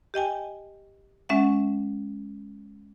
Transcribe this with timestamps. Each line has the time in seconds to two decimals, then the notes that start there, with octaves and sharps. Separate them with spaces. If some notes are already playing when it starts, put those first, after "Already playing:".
0.14 G4 D#5 G5 G#5
1.29 G#3 C#4 E5 F#5